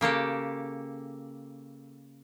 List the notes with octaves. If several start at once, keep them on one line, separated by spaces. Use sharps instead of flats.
C#3 A#3 G4 A4